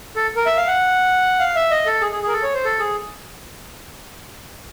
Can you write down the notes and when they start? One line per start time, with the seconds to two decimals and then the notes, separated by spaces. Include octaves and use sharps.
0.16 A4
0.36 A#4
0.46 E5
0.57 F5
0.67 F#5
1.40 F5
1.56 E5
1.71 D#5
1.86 A4
2.01 G#4
2.12 G#4
2.23 G#4 A#4
2.33 A4
2.43 C#5
2.54 C5
2.65 A4
2.80 G#4